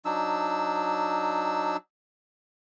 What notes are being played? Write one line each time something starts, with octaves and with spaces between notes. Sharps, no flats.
F#3 D4 D#4 E6